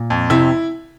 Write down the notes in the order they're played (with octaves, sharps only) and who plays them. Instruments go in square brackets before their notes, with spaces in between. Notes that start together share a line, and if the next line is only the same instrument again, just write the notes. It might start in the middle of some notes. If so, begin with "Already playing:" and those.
Already playing: [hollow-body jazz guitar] A#2
[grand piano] F2
[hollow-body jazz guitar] C3 [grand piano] E4